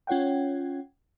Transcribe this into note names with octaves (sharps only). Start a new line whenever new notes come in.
C#4 F4 C#5 F#5 G5